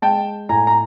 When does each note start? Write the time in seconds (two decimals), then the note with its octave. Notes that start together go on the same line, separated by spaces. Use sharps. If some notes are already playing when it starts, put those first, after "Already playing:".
0.02 G#3 G5 A5
0.49 A2 G#5 A#5
0.67 A#5